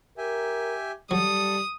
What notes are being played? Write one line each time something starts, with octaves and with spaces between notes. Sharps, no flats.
G4 A#4 E5 G#5
F#3 G3 A4 D#6